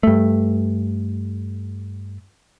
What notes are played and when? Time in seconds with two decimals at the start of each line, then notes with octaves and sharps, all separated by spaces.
0.03 G2 A3